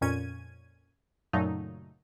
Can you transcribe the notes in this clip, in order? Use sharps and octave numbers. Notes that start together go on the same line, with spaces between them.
F2 A#2 C#4 G#6 D#7
F#2 A#2 C#3 F#3 A3 D#4